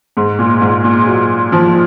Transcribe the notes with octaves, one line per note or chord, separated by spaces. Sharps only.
G#2
A#2
G#2
A#2
F#3
F3